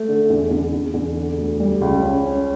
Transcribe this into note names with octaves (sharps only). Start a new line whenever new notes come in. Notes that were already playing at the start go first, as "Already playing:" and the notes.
Already playing: A3
D3
E2
E2
E2
E2
D3
D2
G3
C#2
C#4
C#4